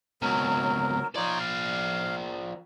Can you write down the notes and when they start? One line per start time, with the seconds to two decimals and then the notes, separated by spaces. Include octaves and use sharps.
0.22 C#2 B2 F#3 A#4
1.16 F3 D#4 F4 C#5 D5
1.39 F5